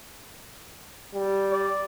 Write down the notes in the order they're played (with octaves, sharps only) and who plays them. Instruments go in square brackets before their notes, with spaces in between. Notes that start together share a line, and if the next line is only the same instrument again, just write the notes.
[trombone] G3
[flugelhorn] D5